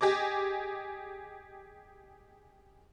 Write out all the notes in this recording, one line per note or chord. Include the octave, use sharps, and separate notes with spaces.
G4 G#4 D#5 D6